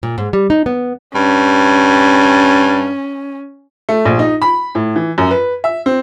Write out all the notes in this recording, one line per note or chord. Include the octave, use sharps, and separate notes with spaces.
A#2
G#2
G3
D#4
B3
G2 C#4
A3
A#1
D#4
B5
A2
E3
F#2
B4
E5
C4